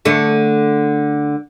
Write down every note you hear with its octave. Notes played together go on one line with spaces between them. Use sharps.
D3 A3